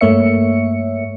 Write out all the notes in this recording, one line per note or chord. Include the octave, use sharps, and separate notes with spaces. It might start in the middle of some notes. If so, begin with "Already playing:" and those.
G2 A3 A#3 C#5 E5 C#7